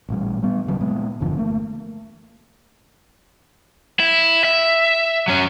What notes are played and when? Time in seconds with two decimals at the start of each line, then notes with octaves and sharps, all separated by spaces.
0.09 A1 A#2 G3
0.43 G3 B3
0.66 D1 C#3 F#3 B3
0.81 A#2 G#3 B3
1.20 G1 E2 D3 F3
1.37 A3 A#3
4.00 E4
4.44 E5
5.28 F#3 C#4